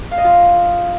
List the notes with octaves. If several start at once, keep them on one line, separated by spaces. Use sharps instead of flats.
F5
D#5
F4